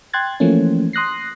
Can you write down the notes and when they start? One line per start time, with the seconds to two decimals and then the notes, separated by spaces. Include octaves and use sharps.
0.13 G5 C6 F#6 G#6 A6
0.40 E3 F3 A3 A#3 C#4
0.93 C6 D#6 F#6 A#6 C7